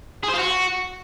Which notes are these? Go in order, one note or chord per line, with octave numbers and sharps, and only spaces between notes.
G#4
C5
F4
F#4